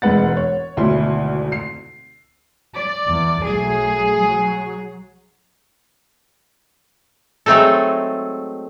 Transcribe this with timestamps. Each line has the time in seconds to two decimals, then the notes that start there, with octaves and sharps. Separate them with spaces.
0.02 E1 G#2 G#3 B4 F#5 A6
0.37 C#5
0.77 G#1 D2 B2 E4 C6
1.52 C7
2.74 D5
3.05 E2
3.43 B1 F#3 A3 G#4
4.19 F#3
7.46 F#3 G#3 A3 C4 D#4 A4